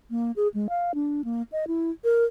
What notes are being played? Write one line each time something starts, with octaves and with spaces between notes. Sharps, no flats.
A#3
G#4
G#3
F5
D4
A#3
D#5
E4
A#4